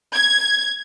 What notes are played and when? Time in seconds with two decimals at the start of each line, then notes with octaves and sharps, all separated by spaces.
0.14 G#6